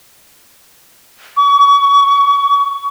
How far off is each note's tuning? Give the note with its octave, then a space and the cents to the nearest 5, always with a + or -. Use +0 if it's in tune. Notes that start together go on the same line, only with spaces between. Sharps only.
C#6 +30